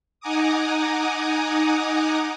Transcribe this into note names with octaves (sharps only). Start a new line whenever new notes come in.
D#4 F#5 G#5 A#5 D6 D#6